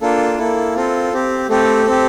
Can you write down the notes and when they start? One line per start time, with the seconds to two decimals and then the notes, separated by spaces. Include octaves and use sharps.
0.01 A#3 D4 F4 A4
0.38 A#3 E4 A4
0.76 C4 F4 A4
1.13 C4 G4
1.49 A3 C4 G4 A4
1.87 C4 G4